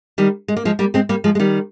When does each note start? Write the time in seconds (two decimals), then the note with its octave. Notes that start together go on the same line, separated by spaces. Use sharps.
0.18 D#3 G3
0.48 G#3
0.57 A#3
0.65 F3 G#3
0.79 G3 A#3
0.94 G#3 C4
1.09 G3 A#3
1.24 F3 G#3
1.35 G#3
1.40 D#3 G3